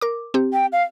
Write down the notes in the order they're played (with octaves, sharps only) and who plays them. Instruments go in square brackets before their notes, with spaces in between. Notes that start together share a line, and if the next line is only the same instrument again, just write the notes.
[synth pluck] A#4 D6
C4 G4
[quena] G5
F5